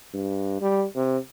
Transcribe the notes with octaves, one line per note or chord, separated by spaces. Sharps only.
G2
G3
C3